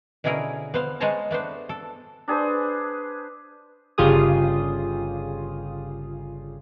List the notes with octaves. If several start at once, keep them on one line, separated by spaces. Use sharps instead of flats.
B2 D3 C#4 E4 G#4 A#4
B3 C5 F5
G#3 B3 C5 C#5 A5 A#5
A3 B3 D4 C5
A4
D4 G#4 B4 C5
G1 C#3 F4 G4 G#4 D#6